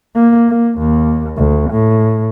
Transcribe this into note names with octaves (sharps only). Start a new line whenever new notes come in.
A#3
A#3
D#2
D2
A2